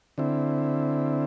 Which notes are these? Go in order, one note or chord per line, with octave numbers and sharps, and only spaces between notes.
D3 C4 E4